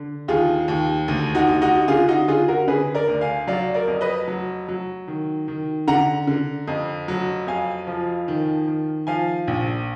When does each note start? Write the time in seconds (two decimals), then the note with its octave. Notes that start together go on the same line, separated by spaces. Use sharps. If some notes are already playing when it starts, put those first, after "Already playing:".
Already playing: D3
0.28 D#2 F4 G#4
0.68 D#2
1.08 D2
1.35 D#4 F#4
1.49 D2
1.62 D#4 F#4
1.88 D3 F4 G#4
2.08 D#4 F#4
2.28 D3 F4 G#4
2.48 F#4 A#4
2.68 D3 G#4 B4
2.94 A#4 D5
3.08 D2
3.21 F5 G#5
3.47 F#3 D5 F5
3.74 A#4 D5
3.87 F2
4.01 B4 D#5
4.28 F#3
4.69 F#3
5.08 D#3
5.48 D#3
5.88 D3 F#5 A#5
6.27 D3
6.68 F2
7.08 F#3
7.47 F2 F5 G#5
7.87 F3
8.28 D#3
8.67 D#3
9.07 F3 F5 G#5
9.48 A#1